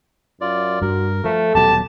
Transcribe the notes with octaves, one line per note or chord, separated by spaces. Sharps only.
F#2 F4 D5
G2 F#4 A#4
F3 A3 A4
D#1 B2 F#3 G4 A5